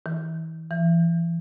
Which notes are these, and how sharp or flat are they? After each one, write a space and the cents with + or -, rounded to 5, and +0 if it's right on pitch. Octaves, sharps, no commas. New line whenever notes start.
E3 -35
E3 +30